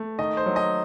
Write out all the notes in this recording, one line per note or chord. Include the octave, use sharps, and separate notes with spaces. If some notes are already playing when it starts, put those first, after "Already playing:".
Already playing: A3
D#3 D#5
C5
F#3
D#5